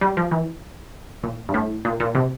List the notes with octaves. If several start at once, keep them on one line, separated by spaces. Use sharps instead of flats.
G3
F3
E3
A#2
G2
A2
A#2
A#2
C3